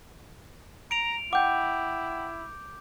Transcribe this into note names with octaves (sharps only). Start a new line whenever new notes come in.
A#5 D7 F7
E4 F#5 G5 D6 G6